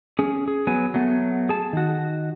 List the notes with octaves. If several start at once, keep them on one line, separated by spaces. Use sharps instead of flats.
C#4 G#4
G#4
F#3 B3 G#5
F#3 A3 B3
G#4 A5
D#3 F#4